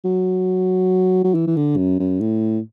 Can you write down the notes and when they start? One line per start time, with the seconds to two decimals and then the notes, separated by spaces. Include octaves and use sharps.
0.05 F#3
1.24 F#3
1.35 E3
1.47 E3
1.56 D3
1.77 F#2
1.99 F#2
2.20 A2